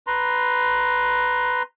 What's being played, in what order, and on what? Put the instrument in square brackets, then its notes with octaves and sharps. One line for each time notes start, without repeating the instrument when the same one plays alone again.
[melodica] B4 A#5 C6